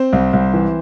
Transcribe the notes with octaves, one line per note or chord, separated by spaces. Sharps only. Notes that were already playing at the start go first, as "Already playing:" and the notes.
Already playing: C4 C5
C2
C2
E3